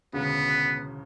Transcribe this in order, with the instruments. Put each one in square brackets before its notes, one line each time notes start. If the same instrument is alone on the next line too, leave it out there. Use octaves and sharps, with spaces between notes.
[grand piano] E1 D2 C#3 [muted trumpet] B3